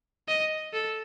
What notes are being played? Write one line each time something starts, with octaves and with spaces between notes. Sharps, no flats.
D#5
A4